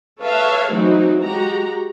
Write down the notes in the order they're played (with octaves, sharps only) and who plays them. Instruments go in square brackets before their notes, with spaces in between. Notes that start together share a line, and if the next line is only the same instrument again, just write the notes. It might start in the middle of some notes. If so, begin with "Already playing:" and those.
[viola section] A4 B4 C#5 E5 F5 A5
E3 F#3 A3 C4 D#4 F#4
G#3 F#4 G4 A#5